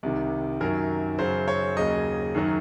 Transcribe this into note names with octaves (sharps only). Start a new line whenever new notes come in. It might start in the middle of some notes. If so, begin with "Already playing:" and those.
C2 C3 D#3
F#2 D#3 F#3 A#4
F#2 C#3 F#3 C5
C#5
D#2 C#3 F#3 D#5
F#2 D#3 F#3